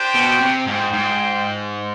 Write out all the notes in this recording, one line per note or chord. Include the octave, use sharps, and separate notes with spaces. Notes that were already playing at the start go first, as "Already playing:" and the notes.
Already playing: D4 G4 C5 G5
B2
C3
G#2 F4 C5 G5
G#2